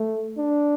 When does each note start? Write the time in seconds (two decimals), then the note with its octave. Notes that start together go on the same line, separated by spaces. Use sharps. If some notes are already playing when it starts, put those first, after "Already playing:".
Already playing: A3
0.38 D4